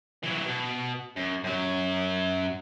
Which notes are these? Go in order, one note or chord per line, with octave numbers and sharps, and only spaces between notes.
E3 F#3
B2
F#2
F#2 F#3